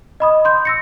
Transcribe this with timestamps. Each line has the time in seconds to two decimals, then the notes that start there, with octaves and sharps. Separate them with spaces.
0.20 D#5 B5 D#6
0.45 C6 G6
0.65 E6 A#6 C#7